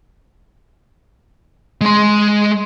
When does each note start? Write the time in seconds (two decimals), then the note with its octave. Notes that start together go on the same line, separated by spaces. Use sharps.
1.81 G#3 C6